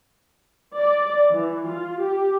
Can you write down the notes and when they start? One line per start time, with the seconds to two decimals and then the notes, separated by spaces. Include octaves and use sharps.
0.78 D5
1.32 E3
1.69 F4
2.02 G4